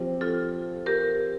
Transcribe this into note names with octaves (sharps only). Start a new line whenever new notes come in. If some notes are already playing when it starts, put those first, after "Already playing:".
Already playing: F3 C4 G4
F4 A4
G4 A#4